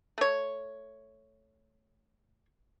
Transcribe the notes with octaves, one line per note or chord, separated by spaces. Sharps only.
A3 C#5